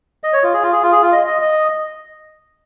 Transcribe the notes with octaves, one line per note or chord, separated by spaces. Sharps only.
D#5
C#5
F4
G#4
F4
G#4
F4
G#4
F4
D#5
D#5
D#5